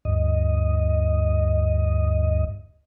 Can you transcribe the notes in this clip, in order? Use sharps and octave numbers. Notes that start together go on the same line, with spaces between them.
D2 G2 D#5